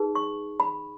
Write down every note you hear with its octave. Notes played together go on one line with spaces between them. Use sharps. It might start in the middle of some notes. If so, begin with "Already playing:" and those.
Already playing: D#4 G#4 B4
C#6
B5